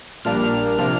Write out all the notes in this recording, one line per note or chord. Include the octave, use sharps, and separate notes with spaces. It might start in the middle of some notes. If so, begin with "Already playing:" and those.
A#1 A#2 G3 A#3 D4 F6
C3 F3 A#3 D4 F6